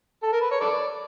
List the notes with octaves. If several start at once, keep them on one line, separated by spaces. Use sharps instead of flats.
A4
A#4
B4
C#5
A4 B4 D5